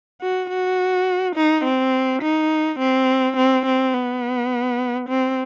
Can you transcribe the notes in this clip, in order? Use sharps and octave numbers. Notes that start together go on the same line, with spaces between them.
F#4
F#4
D#4
C4
D#4
C4
C4
C4
B3
C4